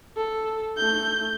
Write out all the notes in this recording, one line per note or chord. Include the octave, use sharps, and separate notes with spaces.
A4
A3 G6